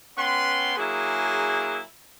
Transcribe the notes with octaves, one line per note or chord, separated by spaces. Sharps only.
B3 C#4 B4 G5 C6
F#3 A#3 E4 G#4